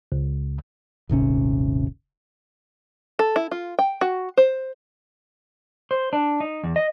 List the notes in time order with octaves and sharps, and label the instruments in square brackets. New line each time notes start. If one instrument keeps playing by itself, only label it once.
[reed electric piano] C#2
[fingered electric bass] D#1 G#1 C3 C#4
[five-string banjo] A4
E4
F4
G5
F#4
C5
[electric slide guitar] C5
D4
D#4
E2
D#5